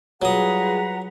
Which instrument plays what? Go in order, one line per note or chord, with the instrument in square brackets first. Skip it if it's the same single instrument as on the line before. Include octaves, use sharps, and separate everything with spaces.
[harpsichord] F#3 D#6 [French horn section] G3 F4 G#4 [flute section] B4 F#5 A#5